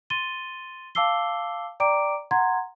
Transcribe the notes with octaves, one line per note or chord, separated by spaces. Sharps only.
C6 A6 D#7 G7
F5 A5 D6 E6 C7 G7
D5 G5 A#5 D6 D7
F#5 A#5 C6 G#6